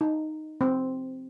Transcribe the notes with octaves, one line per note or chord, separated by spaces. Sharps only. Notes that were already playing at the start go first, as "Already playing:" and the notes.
D#4
C4